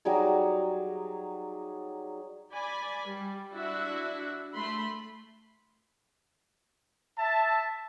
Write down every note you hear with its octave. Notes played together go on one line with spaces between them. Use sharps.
F#3 G3 D#4 G#4
D5 G#5 B5
G3
D4 E4 F#4 E5
A3 B5 C6
E5 A5